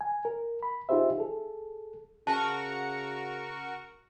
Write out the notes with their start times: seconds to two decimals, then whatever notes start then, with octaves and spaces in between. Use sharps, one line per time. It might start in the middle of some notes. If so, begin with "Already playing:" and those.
0.01 G#5
0.25 A#4
0.63 B5
0.89 D#4 F4 G4 G#4 C5 E5
1.18 G#4 A4
2.27 C#3 F#4 A#4 A5 C#6